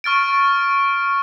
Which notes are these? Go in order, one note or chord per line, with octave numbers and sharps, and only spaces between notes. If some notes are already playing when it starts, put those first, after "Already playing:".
C#6 F6 A6 D7